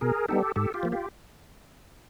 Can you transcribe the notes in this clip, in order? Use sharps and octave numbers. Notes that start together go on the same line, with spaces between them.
B2 G#4 A#4
G3 B3 D#4 G4 A4
G#2 G4 A4
F4 G4
F3 A#3
F4 G4